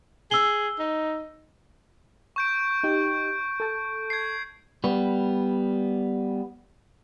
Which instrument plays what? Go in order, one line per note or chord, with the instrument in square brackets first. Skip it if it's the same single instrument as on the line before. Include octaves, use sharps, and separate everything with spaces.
[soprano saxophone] G#4 [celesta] E6 G7
[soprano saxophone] D#4
[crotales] C#6 G6 D7
[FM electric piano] D#4 G4
A4 A5
[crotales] G#6 C7
[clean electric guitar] G3 B3